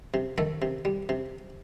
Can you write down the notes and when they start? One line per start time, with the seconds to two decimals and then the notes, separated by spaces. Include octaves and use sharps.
0.14 C3
0.38 D#3 A3 A4
0.62 C3
0.85 G3
1.09 C3